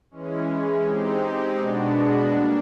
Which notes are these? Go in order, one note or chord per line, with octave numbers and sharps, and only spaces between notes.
E3 G#3 C#4
G#3 C4 D#4 G4
B2 G#3 B3 D4 F#4
G3 A#3 D4